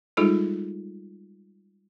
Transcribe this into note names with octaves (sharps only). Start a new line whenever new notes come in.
G3 G#3 D#4 F4 G#4 A4